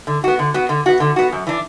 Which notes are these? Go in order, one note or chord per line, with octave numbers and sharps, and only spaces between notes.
D3
B3 F#4
D3
B3 F#4
D3
B3 F#4
D3
B3 F#4
F#2
E3 D4